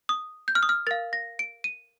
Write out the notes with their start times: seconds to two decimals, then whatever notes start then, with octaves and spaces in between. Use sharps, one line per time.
0.09 D#6
0.48 G6
0.55 F6
0.63 D#6
0.69 F6
0.87 A#4 F5 A6
1.13 A#6
1.39 D7
1.64 D#7